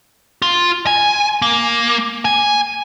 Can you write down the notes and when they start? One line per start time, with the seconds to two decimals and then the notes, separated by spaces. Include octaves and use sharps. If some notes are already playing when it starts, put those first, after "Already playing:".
0.42 F4
0.87 G#5
1.42 A#3
2.25 G#5